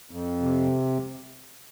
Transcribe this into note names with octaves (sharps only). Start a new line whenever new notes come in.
F2
C3